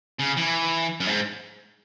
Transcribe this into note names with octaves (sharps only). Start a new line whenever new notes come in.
C#3
E3
F#2
G#2